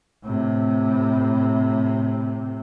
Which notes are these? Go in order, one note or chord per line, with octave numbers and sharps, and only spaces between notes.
A2 C3